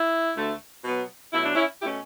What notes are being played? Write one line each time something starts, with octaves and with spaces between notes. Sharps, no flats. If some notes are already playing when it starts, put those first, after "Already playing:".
Already playing: E4
D2 D3 A3
B2 F#3 B3
B2 F#3 A3 E4
D4
C#4 E4
B2 A3 C#4 E4 G4